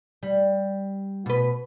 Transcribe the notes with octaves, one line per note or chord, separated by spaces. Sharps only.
G3
B2 B4